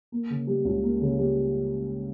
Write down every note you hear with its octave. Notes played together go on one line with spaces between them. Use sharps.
A#3
C#3
G3
C#2
A#3
C#3
G3